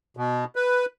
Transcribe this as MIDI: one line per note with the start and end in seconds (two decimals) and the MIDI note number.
0.17 0.44 47
0.56 0.86 71